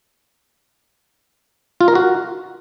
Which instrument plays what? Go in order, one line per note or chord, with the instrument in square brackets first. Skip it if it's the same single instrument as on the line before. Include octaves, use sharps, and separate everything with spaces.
[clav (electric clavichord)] F4
A#4
F#4